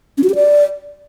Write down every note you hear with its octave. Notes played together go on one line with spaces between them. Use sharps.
C#4
F#4
G4
D5